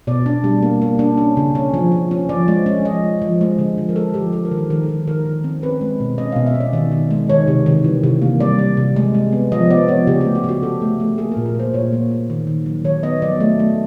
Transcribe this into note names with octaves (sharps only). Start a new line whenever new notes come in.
B2 D5
D4
G3
A#3
A#3
D4
C#4
C#3
C#4
F3
F3
C#4
F3 D5
G#3
C#4
F3 D#5
G#3
F3
G#3
D3
F3
A#4
G#3 A4
F3 G4
F3 A4
A#4
D#3
A4
D#3 A#4
A4
D#3
D#3 A#4
D#3
C4
C#4 B4
G#3
B2
C#4 D#5
B2 F5
E5
C#4
D5
D#3
D#3
G#3
D#3 C#5
C3
D#3
E3
C3
A#3
G3 D5
G3
C3
G#3
G#3
B3
F3 D#5
B3 D5
F3 C#5
C#3 G4
A3 G4
F#4
C#3 G4
C#3 A4
A3
A3
A#3 G#4
A#2 A#4
A#4
A#3 C5
A#2 C#5
A#3
A#3
D#3
D#3
F#3
D#3 C#5
B3 D#5
F#3 D5
A3
A3